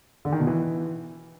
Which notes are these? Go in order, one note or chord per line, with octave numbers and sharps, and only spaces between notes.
D3
D#3
B2
E3